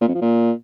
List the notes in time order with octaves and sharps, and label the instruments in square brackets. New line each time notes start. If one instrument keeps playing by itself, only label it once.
[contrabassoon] A#2
F2
F3
A#2